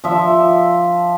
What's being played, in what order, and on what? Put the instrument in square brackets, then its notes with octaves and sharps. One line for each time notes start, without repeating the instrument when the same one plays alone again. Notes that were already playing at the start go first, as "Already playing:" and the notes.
[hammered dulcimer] F3 E5